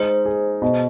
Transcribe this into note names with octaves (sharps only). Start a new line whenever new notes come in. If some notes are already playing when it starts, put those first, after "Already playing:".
Already playing: G#3 D#4 C5
G#4
B2